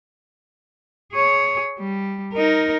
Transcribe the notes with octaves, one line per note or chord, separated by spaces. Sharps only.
G#4 C#5
G3
D#4 A#4